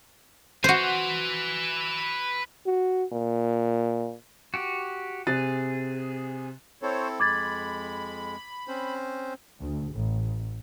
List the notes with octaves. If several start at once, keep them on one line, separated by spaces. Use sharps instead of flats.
F#4 B4 C5 G#5
F#4
A#2
F#4 G4
C3 G#4 F#6 A6
C4 E4 A4 C5 C#5
F2 G#3 B5 D6 G#6 A6
C4 C#4 C5
D2
A1